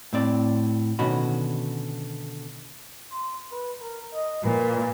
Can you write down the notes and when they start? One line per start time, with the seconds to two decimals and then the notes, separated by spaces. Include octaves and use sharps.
0.13 A2 C4 D5
0.99 B2 D3 D#3 C#4 F#4 B5
3.12 C6
3.52 B4
3.82 A#4
4.14 D#5
4.45 A#2 B4